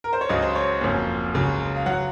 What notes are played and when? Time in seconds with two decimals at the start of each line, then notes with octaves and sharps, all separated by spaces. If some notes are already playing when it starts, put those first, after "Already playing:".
0.04 A#4
0.13 C5
0.21 C#5
0.29 C#2 C#3 F#3 D#5
0.42 C5
0.55 C#5
0.81 F#1 F2 C#3 F#3
1.34 C#2 C#3 F#3
1.76 F5
1.86 F#3 F#5